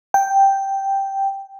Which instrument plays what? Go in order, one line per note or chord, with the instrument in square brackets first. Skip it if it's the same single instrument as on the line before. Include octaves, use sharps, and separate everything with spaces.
[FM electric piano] G5